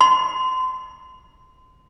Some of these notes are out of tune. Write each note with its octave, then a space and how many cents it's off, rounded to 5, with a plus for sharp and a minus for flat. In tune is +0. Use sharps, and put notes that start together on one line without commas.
C6 -25